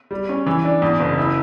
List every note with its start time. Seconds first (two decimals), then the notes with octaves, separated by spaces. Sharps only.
0.11 G3
0.29 C#4
0.47 E3
0.64 D4
0.82 E2
1.00 F#1
1.18 E4